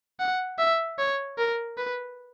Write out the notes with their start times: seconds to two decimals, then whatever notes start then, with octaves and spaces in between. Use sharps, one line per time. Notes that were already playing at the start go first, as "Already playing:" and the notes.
0.20 F#5
0.59 E5
0.98 C#5
1.38 A#4
1.77 B4